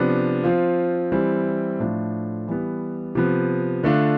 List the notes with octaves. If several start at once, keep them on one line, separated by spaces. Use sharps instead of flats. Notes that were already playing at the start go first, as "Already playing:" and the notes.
Already playing: C3 F3 B3 D4
F3 C4 F4
E3 G3 C4 E4
A2 F3 A3 D4 F4
E3 G3 B3
C3 F3 B3
D3 A3 D4 F4